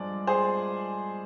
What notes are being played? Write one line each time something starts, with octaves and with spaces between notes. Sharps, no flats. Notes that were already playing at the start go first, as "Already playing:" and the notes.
Already playing: G2 F3 G#3 D5
G#4 C5